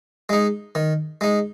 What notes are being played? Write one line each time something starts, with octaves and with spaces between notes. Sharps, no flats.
G#3 D#4
D#3
G#3 D#4